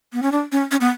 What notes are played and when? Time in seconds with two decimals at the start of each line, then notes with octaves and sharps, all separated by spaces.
0.13 B3
0.22 C#4
0.32 D4
0.52 C#4
0.71 C#4
0.81 B3